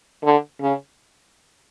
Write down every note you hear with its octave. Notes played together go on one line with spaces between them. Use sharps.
D3
C#3